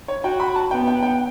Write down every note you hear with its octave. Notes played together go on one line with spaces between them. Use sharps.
C#5
F#4 G5
B5
A5
B3 G5
G5
G5